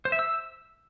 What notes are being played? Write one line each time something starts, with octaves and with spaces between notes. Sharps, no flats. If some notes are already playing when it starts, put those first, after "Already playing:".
C5
E5
E6